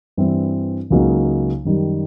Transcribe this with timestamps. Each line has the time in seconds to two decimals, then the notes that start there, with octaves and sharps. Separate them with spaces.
0.17 G2 E3 G3 C4 E4
0.90 C#2 C#3 F#3 A#3 D#4
1.65 F#2 D#3 G3